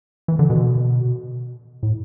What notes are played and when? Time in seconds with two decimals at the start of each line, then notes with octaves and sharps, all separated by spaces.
0.28 E3
0.39 D3
0.50 B2
1.83 A2